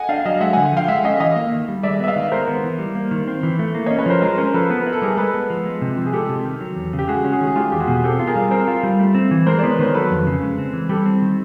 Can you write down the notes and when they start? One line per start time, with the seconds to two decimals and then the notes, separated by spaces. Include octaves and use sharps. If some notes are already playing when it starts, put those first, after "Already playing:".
Already playing: D#5 F#5 G#5
0.09 D4 F5 G5
0.25 F#3 D#5 F5
0.41 G#3 E5 F#5
0.53 F#5 G#5
0.57 D3
0.72 F3 F5 G5
0.88 G#3 E5 F#5
1.04 C#4 D#5 F5
1.20 E3 D#5 F5
1.36 A#3
1.52 D#3
1.68 G3
1.83 G#3 D5 E5
2.00 B3 E5
2.07 D#5 F5
2.16 D#3
2.32 G#3 A#4 C5
2.48 B3
2.64 E3
2.79 G3
2.95 A#3
3.11 D#3
3.28 C4
3.43 E3
3.59 A3
3.75 A#3
3.86 C#5 D#5
3.91 C#4
3.99 B4 C#5
4.06 F3 A#4 C5
4.22 G#3 A#4 C5
4.38 C#4 A#4 C5
4.54 F3 A4 B4
4.69 B3 B4
4.81 A#4
4.87 E4
4.93 A4
5.02 G3 G#4 A#4
5.17 G#3 A4 B4
5.34 B3
5.50 F3
5.66 G#3
5.82 C3
5.97 F3
6.06 G#4
6.13 G#3 G4 A4
6.29 C3
6.45 D#3
6.61 F#3
6.76 E2
6.93 C#3
6.99 G4
7.08 G#3 F#4 G#4
7.25 C#4
7.32 F#4 G#4
7.41 D#3
7.47 G#4
7.56 G#3 F4 G4
7.72 E2 G4
7.80 F#4 G#4
7.88 B2
8.04 C4 G4 A4
8.19 F4
8.27 G#4 A#4
8.35 G3
8.51 C4 A#4 C5
8.68 F4
8.83 G3
8.99 A3
9.15 C4
9.31 E3
9.46 G#3 A#4 C5
9.59 C5 D5
9.63 B3
9.70 B4 C#5
9.79 D#3 A#4 C5
9.94 F#3 A4 B4
10.11 F2
10.27 C#3
10.43 G#3
10.59 C4
10.73 E3
10.89 G3 G4 A4
11.06 C4
11.22 D#3